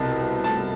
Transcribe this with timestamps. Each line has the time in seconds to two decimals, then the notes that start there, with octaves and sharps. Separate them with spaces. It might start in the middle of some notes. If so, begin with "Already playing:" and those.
Already playing: C2 B2 C4 A5
0.44 A5